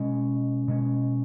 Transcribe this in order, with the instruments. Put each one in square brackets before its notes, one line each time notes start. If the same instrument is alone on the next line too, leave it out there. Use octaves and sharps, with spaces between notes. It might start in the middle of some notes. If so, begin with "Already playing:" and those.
Already playing: [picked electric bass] B2 G#3 C#4
B2 G#3 C#4